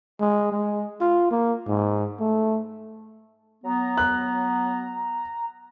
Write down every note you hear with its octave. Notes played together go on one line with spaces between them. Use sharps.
G#3
G#3
F4
A#3
G#2
A3
F#3 B3 A#5
F#6